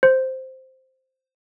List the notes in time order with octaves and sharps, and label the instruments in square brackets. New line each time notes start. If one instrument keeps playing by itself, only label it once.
[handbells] C5